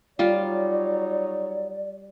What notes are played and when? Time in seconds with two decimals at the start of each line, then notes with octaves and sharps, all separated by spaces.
0.19 F#3 G3 D#4 F4 C#5 D5